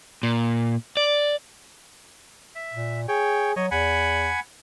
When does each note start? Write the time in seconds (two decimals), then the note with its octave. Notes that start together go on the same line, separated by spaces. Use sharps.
0.23 A#2
0.97 D5
2.55 E5
2.73 A#2
3.08 G#4 C#5 G5
3.56 F#3 C#5 D#5
3.71 E2 F#5 G#5 B5